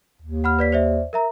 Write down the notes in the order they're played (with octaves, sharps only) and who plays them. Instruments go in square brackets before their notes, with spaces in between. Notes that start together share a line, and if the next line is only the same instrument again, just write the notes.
[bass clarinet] D#2
[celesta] F#5 B5 F6
B4 D5 B6
C5 D5 E5
A#4 E5 A#5